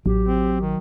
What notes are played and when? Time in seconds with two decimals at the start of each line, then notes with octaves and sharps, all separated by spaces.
0.06 A1 F#3 G4
0.26 C4
0.61 D#3